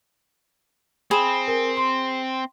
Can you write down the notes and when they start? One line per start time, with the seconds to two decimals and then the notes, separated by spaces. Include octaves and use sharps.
1.11 C4 G#4 B5 E7
1.48 A#4 G#5
1.77 C6